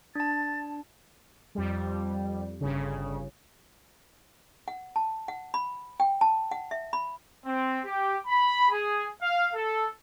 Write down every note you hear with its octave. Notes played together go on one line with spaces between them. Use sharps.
D4 A5 A6
F2 G3
G1 C#3
F#5
A5
F#5
B5
G5
A5
F#5
E5
B5
C4
G4
B5
G#4
F5
A4